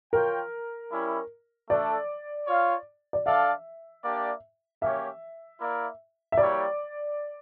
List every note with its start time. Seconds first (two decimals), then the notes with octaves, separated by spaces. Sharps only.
0.13 F4 A#4 C#5 G5
0.91 G3 C#4 E4
1.69 A3 D4 A4 D5
2.47 F4 C#5 F5
3.13 D5
3.26 D4 A4 D5 E5 F5
4.03 A#3 D4 G4 D5
4.81 A#3 C#4 G4 C#5 E5
5.60 A#3 E4 A#4 D5 F5
6.32 E5
6.38 G3 A#3 E4 G4 C#5 D5